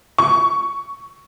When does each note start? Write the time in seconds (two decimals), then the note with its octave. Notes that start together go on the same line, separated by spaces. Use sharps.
0.18 C#6